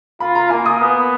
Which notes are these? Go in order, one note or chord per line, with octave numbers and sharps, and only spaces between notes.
F4 B5
A#5
A#3 G#5
D#6
B3